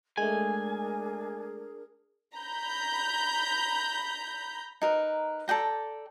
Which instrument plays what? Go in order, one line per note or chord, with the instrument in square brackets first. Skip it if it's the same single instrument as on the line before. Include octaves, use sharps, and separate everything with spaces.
[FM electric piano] G#3 A3 [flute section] D4 G#4 A#4 [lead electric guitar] G#5
[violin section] A#5 B5 G6
[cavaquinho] D#4 A#4 B4
A4 D5 G5 A#5